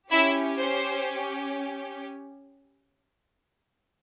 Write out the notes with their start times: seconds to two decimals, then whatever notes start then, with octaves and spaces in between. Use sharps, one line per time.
0.10 C#4 E4 G4 E5
0.58 C5